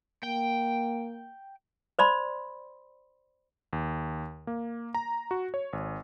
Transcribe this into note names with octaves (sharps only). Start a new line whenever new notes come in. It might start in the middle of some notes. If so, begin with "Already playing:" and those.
A#3 G5
C5 D5 B5 C6
D#2
A#3
A#5
F#4
C#5
G#1